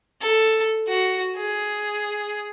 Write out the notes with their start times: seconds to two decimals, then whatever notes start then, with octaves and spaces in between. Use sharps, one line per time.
0.22 A4
0.88 F#4
1.37 G#4